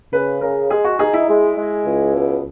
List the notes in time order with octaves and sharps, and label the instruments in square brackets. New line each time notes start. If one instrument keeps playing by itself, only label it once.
[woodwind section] C#3 [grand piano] B4
[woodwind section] C#3 [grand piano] A#4
[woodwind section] G#3 [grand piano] G#4
[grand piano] F#4
[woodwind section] D#4 [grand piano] G#4
[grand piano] E4
[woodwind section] G#3
G#3
C#2
B2